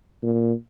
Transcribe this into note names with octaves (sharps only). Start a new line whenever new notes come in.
A#2